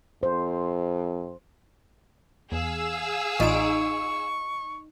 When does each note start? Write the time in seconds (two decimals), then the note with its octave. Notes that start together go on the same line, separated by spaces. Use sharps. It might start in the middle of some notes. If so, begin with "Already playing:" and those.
0.23 F2 C5
2.52 E2 G#4 F5 E6
3.40 A1 D#4 F4 C#6 D7